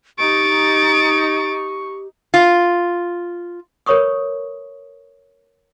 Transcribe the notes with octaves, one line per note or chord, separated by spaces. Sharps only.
D#4 G4 C#6 A6 D7
F4
A#4 B4 C#5 B5 C#6 D#6